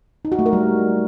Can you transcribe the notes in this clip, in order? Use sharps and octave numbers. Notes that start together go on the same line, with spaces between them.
D#4
F#4
A3
A#4
G3